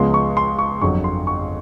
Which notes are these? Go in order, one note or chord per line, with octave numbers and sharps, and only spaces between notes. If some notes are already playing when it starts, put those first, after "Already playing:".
Already playing: C#2 C#3 F3 G#3 B3 C6
C#6
C6
C#6
G1 F2 D3 F#3 C#6
C6
C#6